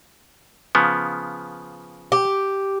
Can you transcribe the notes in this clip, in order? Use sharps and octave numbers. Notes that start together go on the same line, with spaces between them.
C#3 F3 B3
G4